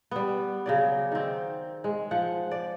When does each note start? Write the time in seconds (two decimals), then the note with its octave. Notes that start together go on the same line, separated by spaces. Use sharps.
0.11 G3 B3
0.66 C#3 F#3 D5
1.12 D#3 C4
1.84 G#3
2.11 F3 F#5
2.51 D5